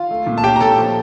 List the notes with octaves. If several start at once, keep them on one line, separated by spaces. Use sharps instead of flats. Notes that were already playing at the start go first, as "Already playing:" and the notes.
Already playing: F4 F5
A3
A#2
A5
C#4 G4 G5
A#5
A#2 A4 A5
F3